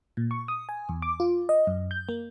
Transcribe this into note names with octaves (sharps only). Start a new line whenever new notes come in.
A#2
C#6
D#6
G#5
E2
D6
F4
D#5
F#2
G6
A#3